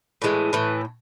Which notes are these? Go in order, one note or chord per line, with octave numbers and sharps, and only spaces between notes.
A2 E3 G#3
A2 E3